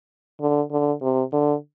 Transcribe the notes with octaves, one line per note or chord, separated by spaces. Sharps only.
D3
D3
C3
D3